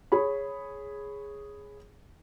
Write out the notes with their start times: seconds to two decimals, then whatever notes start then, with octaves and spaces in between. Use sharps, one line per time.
0.12 G#4 C#5 B5